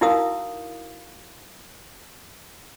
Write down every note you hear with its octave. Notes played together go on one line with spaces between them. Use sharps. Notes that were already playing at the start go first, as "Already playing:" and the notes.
D#4 E4 F#4 A#4 F5 D#6